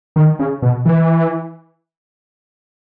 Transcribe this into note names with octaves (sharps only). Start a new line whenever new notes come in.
D#3
C#3
B2
E3